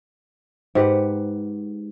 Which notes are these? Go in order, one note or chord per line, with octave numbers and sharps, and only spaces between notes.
G#2 G4 B4 F#5